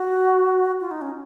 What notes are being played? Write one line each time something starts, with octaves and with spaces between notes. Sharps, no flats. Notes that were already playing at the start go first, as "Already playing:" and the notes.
Already playing: F#4
F4
D#4
C#4